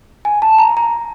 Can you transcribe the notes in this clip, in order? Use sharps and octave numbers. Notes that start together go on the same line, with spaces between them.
G#5
A5
A#5
A#5